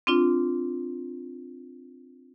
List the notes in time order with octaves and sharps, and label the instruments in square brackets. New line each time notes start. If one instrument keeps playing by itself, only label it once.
[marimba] C4 D4 F4